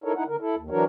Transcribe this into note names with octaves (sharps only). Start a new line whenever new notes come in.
D#4 E4 A4 A#4 C#5
D#4 E4 F#5
D3 A#4
E4 A4
D#2
E3 F#3 D4 F#4 A#4 C#5